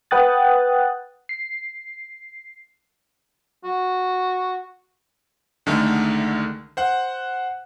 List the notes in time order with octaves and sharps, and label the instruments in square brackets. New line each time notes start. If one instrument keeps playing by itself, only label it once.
[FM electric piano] B4 F#5 G5 D#6 F#6 A6
C7
[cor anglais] F#4
[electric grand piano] C2 D3 D#3 G#3 A3
C5 F#5 F#6